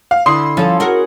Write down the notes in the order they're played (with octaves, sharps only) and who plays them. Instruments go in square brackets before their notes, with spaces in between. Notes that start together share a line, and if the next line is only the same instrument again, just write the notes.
[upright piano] F5
[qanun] D3 E4 B5 [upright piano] C6 D#6 C7
[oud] F3 [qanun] C#4 A4 A5
[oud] F#4 A#4 [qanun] G#4 F#5